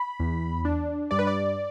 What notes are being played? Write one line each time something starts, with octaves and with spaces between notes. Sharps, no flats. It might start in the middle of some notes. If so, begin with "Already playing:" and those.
Already playing: B5
E2
D4
G2 D5
B4
D5